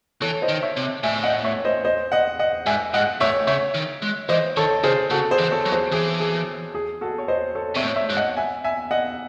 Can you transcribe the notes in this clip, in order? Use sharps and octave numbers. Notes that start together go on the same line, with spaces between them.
E3 A4 C#5
C5 D#5
D#3
C#5 E5
C3
A2 E5 G#5
D#5 F#5
C#5 E5
C5 D#5
C5 D#5
D#5 F#5
D#5 F#5
G#2 E5 G#5
G#2 D#5 F#5
A2 C#5 E5
C#3 C#5 E5
D#3
G#3
E3 C5 D#5
D#3 A4 C#5
C#3 G#4 C5
C#3 F#4 A4
G#4 C5
E3
A4 C#5
F#3
G#4 C5
E3 G#4
G#4
G#4
F#4 A4
C#5
C5 D#5
A4 C#5
C3 C#5 E5
A2
C#5 E5
G#2
D#5 F#5
E5 G#5
E5 G#5
D#5 F#5